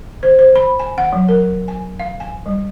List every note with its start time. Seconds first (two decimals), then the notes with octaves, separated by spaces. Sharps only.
0.23 C5
0.39 C5
0.56 B5
0.80 G#5
0.98 F#5
1.13 F#3
1.29 A#4
1.68 G#5
2.00 F5
2.20 G#5
2.46 G3